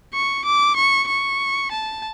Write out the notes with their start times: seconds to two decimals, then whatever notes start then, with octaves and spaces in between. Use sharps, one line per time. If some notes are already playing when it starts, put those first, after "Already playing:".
0.14 C#6
0.45 D6
0.76 C#6
1.09 C#6
1.71 A5